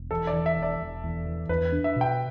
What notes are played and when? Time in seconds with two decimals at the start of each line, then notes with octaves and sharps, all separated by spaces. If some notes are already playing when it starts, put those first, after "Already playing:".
Already playing: E1
0.11 E2 A4
0.27 D5
0.33 E3
0.46 E5
0.57 E1
0.62 D5
0.80 E1
1.04 E2
1.26 E3
1.49 E2 B4
1.72 D4
1.84 E5
1.96 B2 G5